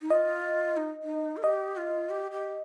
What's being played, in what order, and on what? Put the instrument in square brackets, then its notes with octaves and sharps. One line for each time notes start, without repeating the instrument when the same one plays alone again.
[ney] D#4
[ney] F4 [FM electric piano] D#5
[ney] D#4
D#4
A#4
[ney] G4 [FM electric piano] D#5
[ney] F4
G4
G4